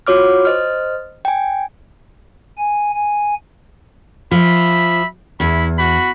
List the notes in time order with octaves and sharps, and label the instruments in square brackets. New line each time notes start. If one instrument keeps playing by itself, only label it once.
[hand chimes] F4 F#4 C#5 D6 F6
C5 D#5 F6
G5 G#5
[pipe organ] G#5
G#5
[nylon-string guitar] F3 [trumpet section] E5 B5
[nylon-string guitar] E2 [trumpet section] E4 B5
[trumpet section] F#4 B5